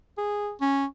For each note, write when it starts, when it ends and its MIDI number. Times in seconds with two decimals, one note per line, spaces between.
0.17 0.52 68
0.61 0.85 61